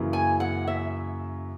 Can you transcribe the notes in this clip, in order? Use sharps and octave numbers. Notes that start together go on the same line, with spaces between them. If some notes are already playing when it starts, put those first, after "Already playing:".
Already playing: F#2 C#3 E3 A#3 E4
G#5
F#5
E5